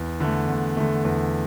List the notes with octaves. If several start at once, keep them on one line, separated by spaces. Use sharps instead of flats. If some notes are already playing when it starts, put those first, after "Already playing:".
Already playing: E2
D3 A3
E2
D3 A3
E2